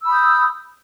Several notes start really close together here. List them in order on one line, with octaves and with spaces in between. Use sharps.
E6 B5 D#6 G6